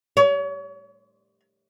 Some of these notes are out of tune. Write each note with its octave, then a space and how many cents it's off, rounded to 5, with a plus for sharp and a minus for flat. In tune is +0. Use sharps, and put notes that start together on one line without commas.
C#5 +35